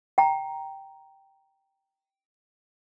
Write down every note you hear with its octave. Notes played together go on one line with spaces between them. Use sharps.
G5 A#5